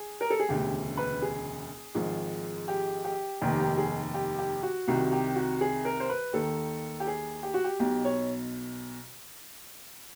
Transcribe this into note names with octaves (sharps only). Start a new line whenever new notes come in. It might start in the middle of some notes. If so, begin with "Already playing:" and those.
Already playing: G#4
A#4
A4
G#4
E1 D2 C#3 G4
B4
G#4
G#1 G#2 F3
G4
G4
F1 D#2 D#3 G4
G4
G#4
G4
G4
F#4
C2 C3 D#3 F#4
G4
F#4
G#4
A#4
C5
B4
D#2 D#3 A4
G4
G#4
G4
F#4
G4
B1 B2 G4
C#5